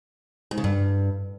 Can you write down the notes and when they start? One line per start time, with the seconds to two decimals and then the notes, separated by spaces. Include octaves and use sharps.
0.51 G#2
0.58 C#3
0.64 G2